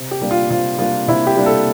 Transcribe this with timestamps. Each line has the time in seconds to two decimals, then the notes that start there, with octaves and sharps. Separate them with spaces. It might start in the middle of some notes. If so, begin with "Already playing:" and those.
Already playing: C3
0.11 G4
0.21 G3 A#3 D4
0.31 F4
0.50 C3 F4
0.78 G3 A#3 D4 F4
1.08 C3 E4
1.27 G4
1.36 G3 A#3 D4
1.46 A4